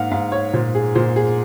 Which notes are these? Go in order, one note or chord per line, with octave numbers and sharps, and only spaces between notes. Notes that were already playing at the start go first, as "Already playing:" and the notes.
Already playing: G#2 A#3 F5 F#5
G#2 F5
C#5
A#2 C5
G#4
A#2 C5
G#4